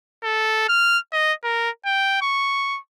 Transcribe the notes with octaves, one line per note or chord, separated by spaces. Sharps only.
A4
F6
D#5
A#4
G5
C#6